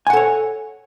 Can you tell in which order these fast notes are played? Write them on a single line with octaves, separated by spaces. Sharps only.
G#5 F#5 A4 C#5